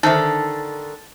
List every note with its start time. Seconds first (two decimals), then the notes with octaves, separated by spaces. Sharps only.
0.03 D3 D#3 D#4 A4 C5 E5